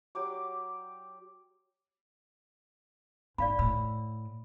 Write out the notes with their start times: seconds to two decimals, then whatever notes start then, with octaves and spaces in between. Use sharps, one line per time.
0.15 F#3 G4 D5 D6
3.38 G#2 D5 F5 B5
3.59 A2 B5 E6